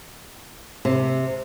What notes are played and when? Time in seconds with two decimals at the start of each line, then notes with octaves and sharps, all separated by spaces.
0.85 C3